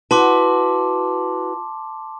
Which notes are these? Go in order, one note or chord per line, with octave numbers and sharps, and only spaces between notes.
E4 F#4 B4 A5 C6 D6